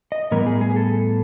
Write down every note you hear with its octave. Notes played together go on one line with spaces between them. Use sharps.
D#5
A2 E3 G3 B3 A#4
G#4
G#4
A4